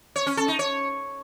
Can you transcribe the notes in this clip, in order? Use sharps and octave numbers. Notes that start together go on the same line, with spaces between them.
C#5
C#4
A4
D#4
C#5